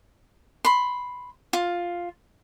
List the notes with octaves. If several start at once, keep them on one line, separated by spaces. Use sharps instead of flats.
B5 C6
F4